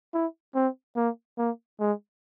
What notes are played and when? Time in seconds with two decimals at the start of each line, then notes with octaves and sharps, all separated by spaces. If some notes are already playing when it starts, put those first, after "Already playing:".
0.14 E4
0.55 C4
0.96 A#3
1.38 A#3
1.80 G#3